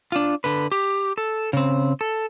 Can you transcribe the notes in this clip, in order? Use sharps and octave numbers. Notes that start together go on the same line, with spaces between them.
D4 F4
D3 B4
G4
A4
C#3 C4
A4